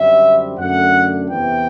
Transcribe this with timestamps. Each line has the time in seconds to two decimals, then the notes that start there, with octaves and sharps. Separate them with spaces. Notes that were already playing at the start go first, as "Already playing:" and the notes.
Already playing: F#2 D3 G3 C4 E5
0.58 F#2 D3 A3 F#5
1.30 E2 C3 E3 B3 G5